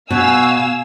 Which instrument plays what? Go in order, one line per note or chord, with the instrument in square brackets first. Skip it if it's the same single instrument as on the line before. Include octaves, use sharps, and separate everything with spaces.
[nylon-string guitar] B2 [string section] F5 G#5 E6